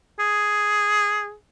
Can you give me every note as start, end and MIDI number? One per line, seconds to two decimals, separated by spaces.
0.20 1.34 68